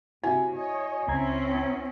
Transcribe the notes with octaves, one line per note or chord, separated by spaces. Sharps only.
C3 E4 F#4 G#5
C#5 D#5
C#2 C4 C#4 E4 A#5 G#6